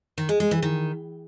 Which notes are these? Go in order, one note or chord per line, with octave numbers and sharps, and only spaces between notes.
D#3
G#3
G#3
E3
D#3